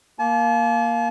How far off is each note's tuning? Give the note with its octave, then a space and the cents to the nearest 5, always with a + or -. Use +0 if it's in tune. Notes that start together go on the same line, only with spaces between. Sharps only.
A#3 +0 A5 -45